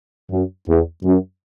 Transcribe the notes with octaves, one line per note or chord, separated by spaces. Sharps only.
F#2
E2
F#2